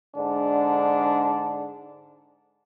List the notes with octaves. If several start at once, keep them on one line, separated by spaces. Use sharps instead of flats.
G#2 D3 D4